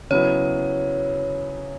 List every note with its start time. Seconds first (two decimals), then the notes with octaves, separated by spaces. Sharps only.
0.10 C#3 F#3 B3 E4 C#5